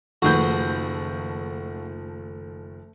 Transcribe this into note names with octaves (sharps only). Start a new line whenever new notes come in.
F#1 D#3 F3 A3 F#4 G#4 B4 G6